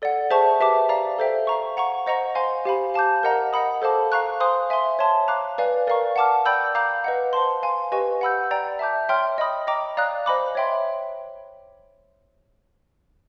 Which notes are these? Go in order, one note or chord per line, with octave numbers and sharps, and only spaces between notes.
A4 D5 F#5
G#4 C5 E5 A5 C#6
G4 B4 E5 A5 D6
D5 F5 A#5
A4 C5 E5 G5
F5 A#5 C#6
F#5 A#5 C#6
C5 D#5 F#5 A#5 C#6
C5 F5 G#5 C6
G4 C5 F5 G#5 B5
F5 A5 D6 G6
A#4 D#5 F#5 A#5
D#5 F#5 B5 D#6
A4 C5 F5 A5 D6
F5 A#5 C#6 F#6
C5 F5 G#5 C6 D#6
E5 G#5 C6
C#5 E5 A5 C6
F5 A#5 D6 F#6
B4 D5 F5 G#5
A#4 D5 F5 A#5 C#6
F#5 A5 D6 F6
D5 G5 B5 E6 G6
F5 A#5 D6 G6
B4 D#5 F#5
C5 F5 A5 C6
F5 G#5 C6
G4 B4 D#5 G#5 C#6
F#5 B5 E6 G6
D5 G5 A#5
E5 A5 D6 G6
C#5 E5 G5 C6 F6
D#5 G5 B5 D#6
D#5 G5 A#5 D6
D5 F5 A#5 D#6 F#6
C5 D#5 G#5 B5 D6
C#5 E5 G5 C6